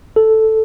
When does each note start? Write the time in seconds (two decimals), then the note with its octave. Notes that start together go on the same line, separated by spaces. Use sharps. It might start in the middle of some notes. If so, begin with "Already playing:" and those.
0.16 A4